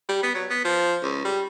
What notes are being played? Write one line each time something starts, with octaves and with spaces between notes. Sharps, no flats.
G3
B3
F#3
B3
F3
C#2
G3